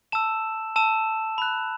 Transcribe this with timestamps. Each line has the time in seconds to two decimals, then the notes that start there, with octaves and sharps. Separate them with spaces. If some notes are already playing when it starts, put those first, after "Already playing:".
0.12 A5 E6 E7
0.76 A5 E6 E7
1.38 B5 F#6